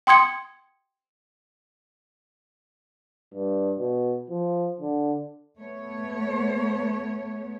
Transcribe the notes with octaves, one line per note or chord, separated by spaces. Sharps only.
G5 C6 D#6 G#6 C#7
G2
B2
F3
D3
A3 B3 C#5